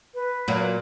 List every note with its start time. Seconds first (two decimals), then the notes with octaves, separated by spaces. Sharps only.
0.14 B4
0.48 A#2 F#3